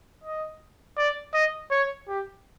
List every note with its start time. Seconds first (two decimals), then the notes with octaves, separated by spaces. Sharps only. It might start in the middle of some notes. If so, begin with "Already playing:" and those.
0.24 D#5
0.98 D5
1.34 D#5
1.71 C#5
2.08 G4